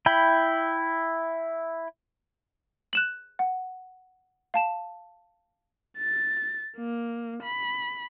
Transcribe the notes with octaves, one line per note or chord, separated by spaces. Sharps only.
E4 G5 B5
F#6 E7 F#7
F#5
F5 A5 E7
A6
A#3
B5